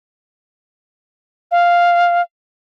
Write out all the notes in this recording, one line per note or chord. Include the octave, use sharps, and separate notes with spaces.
F5